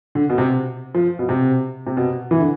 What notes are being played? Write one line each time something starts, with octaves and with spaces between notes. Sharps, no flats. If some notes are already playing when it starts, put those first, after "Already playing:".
D3
B2
C3
F3
B2
C3
C3
B2
E3
D3